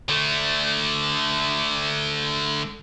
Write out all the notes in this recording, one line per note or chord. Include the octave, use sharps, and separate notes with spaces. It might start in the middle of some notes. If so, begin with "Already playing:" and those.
D3 A3